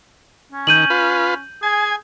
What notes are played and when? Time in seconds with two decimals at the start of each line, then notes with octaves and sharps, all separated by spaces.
0.52 C#4
0.67 D#3 G6 D#7 F#7
0.90 F4 B4
1.63 G#4 G#5